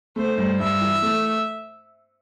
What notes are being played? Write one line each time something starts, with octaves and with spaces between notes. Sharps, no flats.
A3 C5
G2
G2 E5
E3
A3